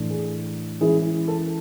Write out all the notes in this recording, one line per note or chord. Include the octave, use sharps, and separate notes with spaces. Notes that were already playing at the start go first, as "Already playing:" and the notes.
Already playing: A2 E3 A3 D4
G#4
E3 G#3 C#4 E4 G#4
A4